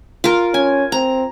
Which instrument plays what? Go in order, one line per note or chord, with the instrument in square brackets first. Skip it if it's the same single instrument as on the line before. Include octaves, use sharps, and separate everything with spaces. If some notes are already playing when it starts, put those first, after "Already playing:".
[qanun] F4 A#4
[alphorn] C#4 [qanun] G#5
[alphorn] C4 [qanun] A#5